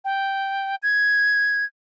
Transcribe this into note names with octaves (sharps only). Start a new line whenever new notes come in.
G5
G#6